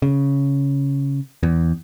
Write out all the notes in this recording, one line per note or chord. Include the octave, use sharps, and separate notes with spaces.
C#3
E2